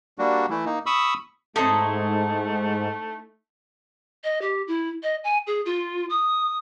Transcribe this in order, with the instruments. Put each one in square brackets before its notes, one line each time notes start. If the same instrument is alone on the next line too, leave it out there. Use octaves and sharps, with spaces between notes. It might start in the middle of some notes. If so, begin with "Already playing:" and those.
[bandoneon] G3 A#3 D4 F#4
E3 A3 E4
A#3 D#4
B5 C#6 D#6 E6
[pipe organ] G#2 [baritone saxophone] A3 [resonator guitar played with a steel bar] C4 A4 [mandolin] D#4 E4 C#5
[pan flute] D#5
G4
E4
D#5
G#5
G#4
F4
D#6